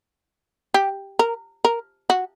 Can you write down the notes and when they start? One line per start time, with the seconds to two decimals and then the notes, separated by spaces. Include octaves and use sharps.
0.74 G4
1.19 A#4
1.65 A#4
2.10 F#4